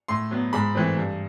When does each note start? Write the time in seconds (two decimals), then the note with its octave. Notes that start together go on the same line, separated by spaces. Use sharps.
0.08 A2 C6
0.31 F#3 B3
0.53 G#2 B5
0.75 E3 A3 C4
0.97 G2